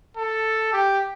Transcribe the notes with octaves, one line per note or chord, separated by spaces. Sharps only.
A4
G4